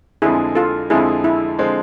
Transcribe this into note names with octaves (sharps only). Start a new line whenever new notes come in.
F2 D3 F3 G#3 E4 G#4
F4 A4
F2 D3 F3 G#3 E4 G#4
E4
D3 F3 G#3 C4